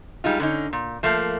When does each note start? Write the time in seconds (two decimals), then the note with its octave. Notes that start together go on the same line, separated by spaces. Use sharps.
0.24 G3 G#3 D#4 F4
0.40 D3 C#4 D#4
0.73 A#2
1.03 F3 A3 A#3